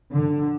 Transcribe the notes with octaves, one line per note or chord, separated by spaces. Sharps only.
D3